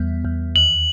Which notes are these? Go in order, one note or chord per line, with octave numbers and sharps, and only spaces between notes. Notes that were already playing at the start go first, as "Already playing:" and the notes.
Already playing: E2 G3 B3
E2
D#2 F#7